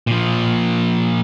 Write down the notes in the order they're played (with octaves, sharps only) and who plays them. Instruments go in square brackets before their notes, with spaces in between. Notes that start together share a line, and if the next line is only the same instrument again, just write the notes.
[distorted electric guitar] A#2 F3